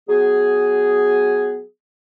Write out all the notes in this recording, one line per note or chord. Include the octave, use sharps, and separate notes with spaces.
F#3 B3 G#4